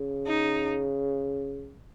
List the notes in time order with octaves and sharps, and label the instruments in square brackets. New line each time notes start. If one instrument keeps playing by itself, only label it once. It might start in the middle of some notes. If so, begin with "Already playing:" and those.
Already playing: [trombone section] C#3
[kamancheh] D#4